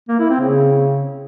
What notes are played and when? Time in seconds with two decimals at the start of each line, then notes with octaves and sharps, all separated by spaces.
0.09 A#3
0.19 E4
0.30 C4
0.40 C#3